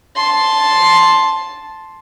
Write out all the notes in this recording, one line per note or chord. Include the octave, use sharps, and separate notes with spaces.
A5 C6